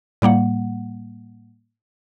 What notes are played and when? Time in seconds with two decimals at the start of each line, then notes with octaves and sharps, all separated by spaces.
0.22 A2 G3 A#3 F#5